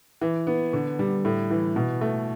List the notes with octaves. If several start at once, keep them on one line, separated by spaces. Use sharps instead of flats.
E3
B3
D3
G3
A2
E3
B2
A3